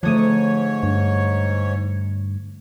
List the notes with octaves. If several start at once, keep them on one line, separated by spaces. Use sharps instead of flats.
G#2 D3 F3 A3 C#5 D#6 D#7
G2